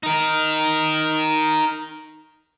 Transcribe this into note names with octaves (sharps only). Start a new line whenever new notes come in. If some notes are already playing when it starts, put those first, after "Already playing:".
D#4 A#4